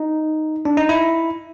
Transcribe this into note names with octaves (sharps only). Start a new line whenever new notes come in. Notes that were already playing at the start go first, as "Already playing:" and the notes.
Already playing: D#4
D4
D#4
E4